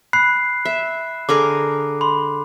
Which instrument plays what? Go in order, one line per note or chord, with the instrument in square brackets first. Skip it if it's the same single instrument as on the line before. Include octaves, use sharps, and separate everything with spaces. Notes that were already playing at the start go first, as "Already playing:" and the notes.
[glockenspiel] B5 F#6 C7
[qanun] E5
[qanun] D3 G#4 A#4 [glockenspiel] D6
[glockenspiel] B5 C6